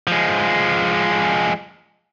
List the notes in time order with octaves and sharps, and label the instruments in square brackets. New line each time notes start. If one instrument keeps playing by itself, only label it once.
[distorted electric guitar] F3 G#3